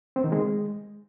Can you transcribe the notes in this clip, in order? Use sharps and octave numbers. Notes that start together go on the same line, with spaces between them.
C4
D#3
G#3